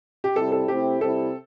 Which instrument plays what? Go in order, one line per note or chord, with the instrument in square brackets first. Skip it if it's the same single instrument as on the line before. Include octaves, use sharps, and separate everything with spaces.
[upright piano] G4
[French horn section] C3 G3 C4 E4 [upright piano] A4
[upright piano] A4
[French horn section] C3 A3 C4 E4 [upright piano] G4
[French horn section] C3 G3 C4 E4 [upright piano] A4